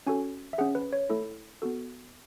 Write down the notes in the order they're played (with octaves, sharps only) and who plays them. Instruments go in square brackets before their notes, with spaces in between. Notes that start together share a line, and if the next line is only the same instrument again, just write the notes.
[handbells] C#4 F#4 A4 G#5
E5
C#4 G#4 F#5
B4
C#5
A3 E4 A4
B3 F#4 A4